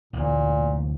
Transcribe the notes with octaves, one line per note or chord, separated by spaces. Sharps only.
A1 D2 A#2 A#3